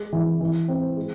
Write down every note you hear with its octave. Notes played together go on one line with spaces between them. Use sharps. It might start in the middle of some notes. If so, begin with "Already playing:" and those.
Already playing: G#3
E3
E3
C4
G#3